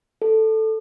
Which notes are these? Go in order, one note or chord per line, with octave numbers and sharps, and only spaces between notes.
A4